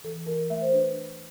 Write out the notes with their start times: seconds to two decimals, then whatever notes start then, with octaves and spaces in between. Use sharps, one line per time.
0.04 E3 A4
0.26 E3 A#4
0.50 A3 E5
0.62 C5
0.73 D4 B4